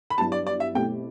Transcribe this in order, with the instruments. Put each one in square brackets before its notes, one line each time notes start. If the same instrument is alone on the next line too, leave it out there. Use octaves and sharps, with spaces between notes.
[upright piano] B5
[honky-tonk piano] G2 F#3 B3 E4 [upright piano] A5
[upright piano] D5
D5
E5
[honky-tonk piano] B2 A3 C4 E4 G4 [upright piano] G5